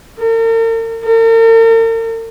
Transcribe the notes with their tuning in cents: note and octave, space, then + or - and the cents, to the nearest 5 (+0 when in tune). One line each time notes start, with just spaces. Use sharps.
A#4 -45
A#4 -45